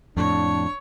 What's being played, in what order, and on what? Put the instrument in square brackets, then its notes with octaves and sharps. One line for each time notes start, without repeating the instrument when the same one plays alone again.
[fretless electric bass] F2 A2 [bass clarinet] D4 [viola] C#5